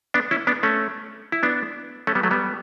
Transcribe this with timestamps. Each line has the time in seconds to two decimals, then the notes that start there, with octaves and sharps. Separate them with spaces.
0.14 B3 D4
0.31 C#4 E4
0.47 B3 D4
0.63 A3 C#4
1.32 E4
1.43 B3 D4
2.07 A3 C#4
2.15 G3 B3
2.23 F#3 A3
2.31 G3 B3